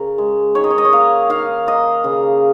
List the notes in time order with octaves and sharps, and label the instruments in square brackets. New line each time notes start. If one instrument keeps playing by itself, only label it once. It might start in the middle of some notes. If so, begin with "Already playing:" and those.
Already playing: [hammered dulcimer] C#3 A#4
G#3
D#3 C#5
D#5
C#5
D#5
C#5
A#3 F5
D#3 F5
A#3 D#5
C#3